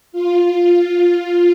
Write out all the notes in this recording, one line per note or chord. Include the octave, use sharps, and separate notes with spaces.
F4